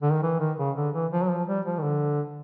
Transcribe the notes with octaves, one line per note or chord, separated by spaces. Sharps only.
D3
D#3
E3
D#3
C#3
D3
E3
F3
F#3
F3
G3
F3
D#3
D3